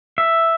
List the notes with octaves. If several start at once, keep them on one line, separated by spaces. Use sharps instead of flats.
E5